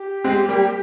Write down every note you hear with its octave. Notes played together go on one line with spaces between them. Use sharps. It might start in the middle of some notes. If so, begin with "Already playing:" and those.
Already playing: G4
G#3 C4
G3 A#3